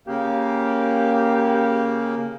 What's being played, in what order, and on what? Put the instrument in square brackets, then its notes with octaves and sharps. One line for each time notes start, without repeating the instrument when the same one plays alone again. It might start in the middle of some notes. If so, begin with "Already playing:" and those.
[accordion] C#3 A#3 [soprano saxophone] G4